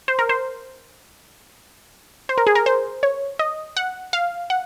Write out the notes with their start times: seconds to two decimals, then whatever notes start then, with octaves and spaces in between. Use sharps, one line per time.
0.08 C5
0.19 A#4
0.29 C5
2.29 C5
2.38 A#4
2.47 G#4
2.55 A#4
2.66 C5
3.03 C#5
3.39 D#5
3.77 F#5
4.13 F5
4.50 F#5